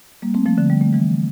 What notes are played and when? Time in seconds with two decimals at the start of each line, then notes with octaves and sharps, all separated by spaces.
0.22 G3 A#3
0.34 A3 C4
0.46 F3 A3
0.58 D3 F3
0.70 G3
0.81 A3
0.93 E3 G3